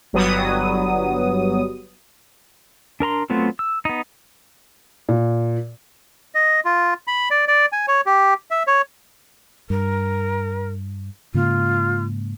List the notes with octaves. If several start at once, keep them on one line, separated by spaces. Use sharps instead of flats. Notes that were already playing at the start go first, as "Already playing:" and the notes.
G1 F#3 G3 B3 D#6
D4 A#4 A#5 C6
F#3 A3 B3 C4 F4
E6
B3 D#4
A#2
D#5
F4
B5
D5
D5
G#5
C#5
G4
E5
C#5
G2 A#4
G#2 C#3 A#3 F4